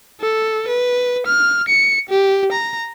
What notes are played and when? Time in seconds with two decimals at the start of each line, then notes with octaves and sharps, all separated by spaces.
0.21 A4
0.68 B4
1.27 F6
1.68 C#7
2.09 G4
2.52 A#5